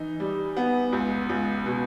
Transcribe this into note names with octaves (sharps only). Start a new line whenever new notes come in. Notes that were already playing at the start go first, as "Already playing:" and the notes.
Already playing: E3 D#4
G3
B3
C#2
C#2
B2